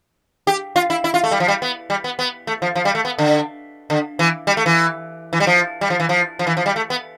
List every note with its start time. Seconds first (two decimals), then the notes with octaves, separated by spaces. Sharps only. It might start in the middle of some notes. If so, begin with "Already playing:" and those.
0.47 G4
0.76 F4
0.90 E4
1.04 E4
1.14 F4
1.24 A3
1.31 G3
1.40 F3
1.48 G3
1.62 B3
1.90 G3
2.04 B3
2.19 B3
2.47 A3
2.62 F3
2.75 F3
2.85 G3
2.95 A3
3.05 B3
3.18 D3
3.90 D3
4.19 E3
4.47 G3
4.57 A3
4.66 E3
5.33 E3
5.40 G3
5.47 F3
5.81 G3
5.90 F3
6.00 E3
6.09 F3
6.39 F3
6.47 E3
6.57 F3
6.66 G3
6.76 A3
6.90 B3